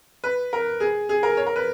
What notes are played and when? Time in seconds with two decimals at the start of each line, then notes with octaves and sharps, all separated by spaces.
0.24 B4
0.53 A#4
0.80 G#4
1.09 G#4
1.23 A#4
1.37 C#5
1.47 A#4
1.56 B4